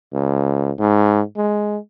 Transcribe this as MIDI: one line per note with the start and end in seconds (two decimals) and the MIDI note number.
0.13 0.71 37
0.79 1.21 44
1.37 1.77 56